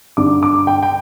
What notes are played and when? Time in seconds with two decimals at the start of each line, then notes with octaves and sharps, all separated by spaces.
0.17 G2 D3 G3 D4 D6
0.43 D6
0.67 G5
0.83 G5